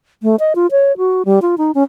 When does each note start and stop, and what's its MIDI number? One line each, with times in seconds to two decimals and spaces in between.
0.23 0.36 57
0.40 0.53 75
0.55 0.67 65
0.71 0.96 73
0.97 1.23 66
1.25 1.39 55
1.42 1.55 65
1.58 1.71 63
1.75 1.83 61